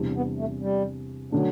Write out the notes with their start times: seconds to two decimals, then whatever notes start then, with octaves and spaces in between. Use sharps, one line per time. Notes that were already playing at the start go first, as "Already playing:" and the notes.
Already playing: E2 C3 G3 D4
0.15 B3
0.38 A3
0.62 G3
1.32 D3 F#3 A3 D4